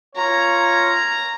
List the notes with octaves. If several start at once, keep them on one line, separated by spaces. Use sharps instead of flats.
F4 C#5 A#5